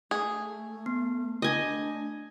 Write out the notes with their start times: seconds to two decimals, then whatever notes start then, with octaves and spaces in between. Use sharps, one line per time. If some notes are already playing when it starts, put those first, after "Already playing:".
0.11 A3 G#4
0.86 B3
1.42 A3 D4 D#5 G#5